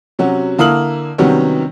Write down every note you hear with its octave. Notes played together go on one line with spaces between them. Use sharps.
C3 F#3 C#4 F#4
D3 A#3 E4 D#6 F6 F#7
C3 D#3 F#3 G3 B3 C#4